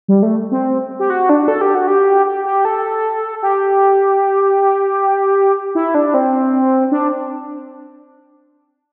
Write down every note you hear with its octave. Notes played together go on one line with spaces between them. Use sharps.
G3
A3
C4
G4
F#4
D4
A4
G4
F#4
G4
G4
G4
A4
G4
E4
D4
C4
D4